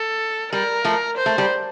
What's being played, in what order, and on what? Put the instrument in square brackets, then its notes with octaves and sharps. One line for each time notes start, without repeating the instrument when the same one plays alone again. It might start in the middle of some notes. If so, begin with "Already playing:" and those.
Already playing: [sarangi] A4
[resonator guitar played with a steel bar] G3 [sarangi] A#4
[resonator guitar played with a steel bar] F3 A3
[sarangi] C5
[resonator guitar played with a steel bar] A3
G3